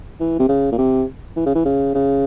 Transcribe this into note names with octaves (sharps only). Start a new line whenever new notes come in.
E3
C3
C#3
A#2
C3
E3
C#3
E3
C#3
C#3